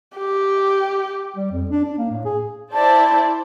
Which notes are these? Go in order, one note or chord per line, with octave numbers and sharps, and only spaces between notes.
G4
G3
F2
D4
D4
A#3
A2
G#4
E4 C5 D5 A5